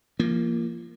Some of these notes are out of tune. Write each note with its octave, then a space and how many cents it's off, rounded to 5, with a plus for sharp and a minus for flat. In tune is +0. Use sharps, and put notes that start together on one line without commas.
F3 -30 A#3 +0